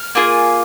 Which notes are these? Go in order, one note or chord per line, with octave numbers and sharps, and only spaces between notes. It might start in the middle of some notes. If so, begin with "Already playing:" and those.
Already playing: F6
A#3 F4 G#4